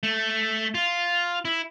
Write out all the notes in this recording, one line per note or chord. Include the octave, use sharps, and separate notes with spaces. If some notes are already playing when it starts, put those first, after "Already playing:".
A3
F4
E4